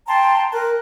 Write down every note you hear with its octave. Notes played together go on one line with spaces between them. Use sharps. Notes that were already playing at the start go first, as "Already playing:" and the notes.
G5 A5 A#5 C6
A#4 F#6